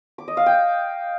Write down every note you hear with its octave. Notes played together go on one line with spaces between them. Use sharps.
D6
D#5
F5
G5